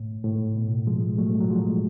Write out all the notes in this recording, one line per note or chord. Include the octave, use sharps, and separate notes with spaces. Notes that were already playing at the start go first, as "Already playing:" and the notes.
Already playing: A2
A2
B2
F3 G#3
F#3 A3
F#3
F3 G#3